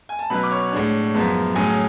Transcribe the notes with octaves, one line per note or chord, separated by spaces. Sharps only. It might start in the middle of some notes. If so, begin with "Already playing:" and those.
G#5
A5
B2 F#3 C#4 B4 B5
D6
C#5 C#6
A2 G#3 D4
F#2 F3 G#3 B3
A2 F#3 C#4 G#4 G#5